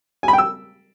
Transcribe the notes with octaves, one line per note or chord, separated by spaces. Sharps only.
G#5
B5
G5
E6